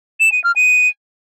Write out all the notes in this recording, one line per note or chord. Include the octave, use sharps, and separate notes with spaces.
E7
D#7
F6
D#7